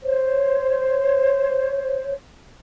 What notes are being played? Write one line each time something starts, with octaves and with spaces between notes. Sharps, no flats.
C5 C#5